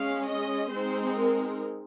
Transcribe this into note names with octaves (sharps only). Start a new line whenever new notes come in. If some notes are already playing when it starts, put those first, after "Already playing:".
Already playing: G#3 C#4 F5
D#5
G#3 C4 D#4 C5
A#4